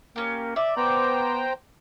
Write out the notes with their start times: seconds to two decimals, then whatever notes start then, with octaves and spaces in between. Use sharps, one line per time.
0.16 A#3 C#4 G4
0.56 D5 E5
0.77 B3 C5 G5 A#5